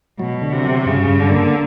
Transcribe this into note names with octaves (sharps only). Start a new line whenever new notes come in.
B2 F#3
D3
C3
F#3
G2 C#3
G2
D3
A#3